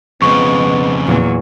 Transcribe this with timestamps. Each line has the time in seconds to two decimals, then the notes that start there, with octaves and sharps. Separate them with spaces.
0.22 F2 C#3 G#3 B3 C#6
1.07 E2 A#2 F#3